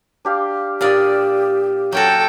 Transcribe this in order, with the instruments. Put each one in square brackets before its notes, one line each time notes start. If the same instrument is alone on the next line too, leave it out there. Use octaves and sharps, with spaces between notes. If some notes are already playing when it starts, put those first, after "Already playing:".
[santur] D4 G4 F5
[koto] A#2 D4 D5 [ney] G4 [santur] F5 D#6 E6
[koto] F#3 C#4 F#4 [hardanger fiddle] A4 G5